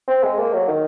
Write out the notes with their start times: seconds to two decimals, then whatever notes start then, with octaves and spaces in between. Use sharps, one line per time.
0.08 C4
0.23 G#3
0.39 A#3
0.53 F#3
0.68 D#3